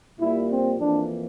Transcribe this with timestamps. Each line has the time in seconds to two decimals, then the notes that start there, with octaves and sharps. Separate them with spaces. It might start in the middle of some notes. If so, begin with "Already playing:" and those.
0.19 A#2 G3 A#3 E4
0.49 C4
0.78 F2 E3 A#3 D4